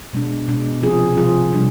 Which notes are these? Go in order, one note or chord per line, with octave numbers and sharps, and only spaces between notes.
B2 G#3 D4
B2 G#3 D4
C3 F3 C4 F4 G#4
C3 F3 C4 F4 G#4
C3 G3 D4